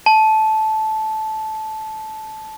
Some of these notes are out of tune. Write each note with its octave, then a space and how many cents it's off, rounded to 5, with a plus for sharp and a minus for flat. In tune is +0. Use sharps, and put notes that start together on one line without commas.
A5 -15